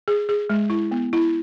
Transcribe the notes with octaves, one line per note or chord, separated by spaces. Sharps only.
G#4
G#4
G#3
E4
B3
E4